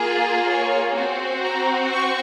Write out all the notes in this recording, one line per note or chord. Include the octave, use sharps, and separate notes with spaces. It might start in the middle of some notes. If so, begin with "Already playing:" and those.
Already playing: A#3 F4 G#4
C#5
C4 F#4
A#5
C#6